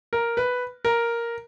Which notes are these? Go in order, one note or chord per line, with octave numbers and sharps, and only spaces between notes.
A#4
B4
A#4